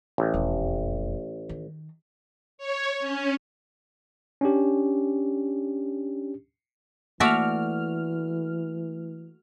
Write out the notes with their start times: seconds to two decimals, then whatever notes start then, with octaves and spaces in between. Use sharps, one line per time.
0.18 A1
0.34 E1 F2
1.49 D#3
2.58 C#5
3.00 C#4
4.41 C#4 D4 G4
7.20 E3 A3 A#3 F#4 D5 E5 F6